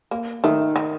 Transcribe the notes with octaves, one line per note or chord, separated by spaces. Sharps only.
A#3
D#3 A3
D#3